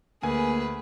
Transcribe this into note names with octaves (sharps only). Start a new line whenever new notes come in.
D2 A#3 G#4 B4 G#5